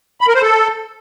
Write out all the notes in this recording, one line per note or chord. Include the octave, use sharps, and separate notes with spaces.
B5
A#4
C5
A4